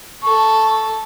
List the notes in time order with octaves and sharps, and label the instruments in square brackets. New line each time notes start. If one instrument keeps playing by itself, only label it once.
[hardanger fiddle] A4 [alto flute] C#6